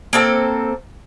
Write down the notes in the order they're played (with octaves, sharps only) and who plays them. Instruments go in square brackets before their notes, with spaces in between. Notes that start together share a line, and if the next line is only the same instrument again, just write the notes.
[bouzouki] A#3 C4 A4